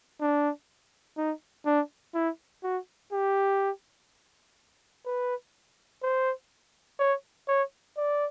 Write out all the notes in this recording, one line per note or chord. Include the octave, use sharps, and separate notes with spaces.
D4
D#4
D4
E4
F#4
G4
B4
C5
C#5
C#5
D5